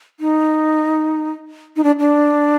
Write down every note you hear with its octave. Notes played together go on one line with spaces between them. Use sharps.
D#4
D#4
D4
D4